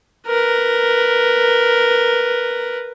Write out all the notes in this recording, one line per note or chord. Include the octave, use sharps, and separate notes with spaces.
A#4 B4